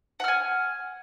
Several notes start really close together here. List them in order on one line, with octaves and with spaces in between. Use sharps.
F#5 F6 G#5